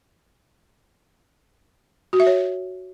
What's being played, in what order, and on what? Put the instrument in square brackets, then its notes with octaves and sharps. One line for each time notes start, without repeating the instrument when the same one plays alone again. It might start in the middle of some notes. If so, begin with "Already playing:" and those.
[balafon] F#4
E5
C#5